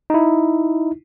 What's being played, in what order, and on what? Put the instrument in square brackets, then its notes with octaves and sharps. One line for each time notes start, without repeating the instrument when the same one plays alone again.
[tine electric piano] D#4 E4